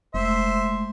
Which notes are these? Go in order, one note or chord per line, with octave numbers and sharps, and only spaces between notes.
F1 G#3 A3 C5 E5